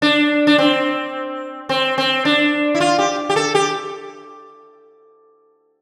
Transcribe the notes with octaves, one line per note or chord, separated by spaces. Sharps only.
D4
D4
C4
C4
C4
D4
E4
F4
G4
G4
A4
G4